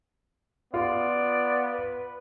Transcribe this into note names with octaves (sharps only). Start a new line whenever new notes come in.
B3 F4 D5
B4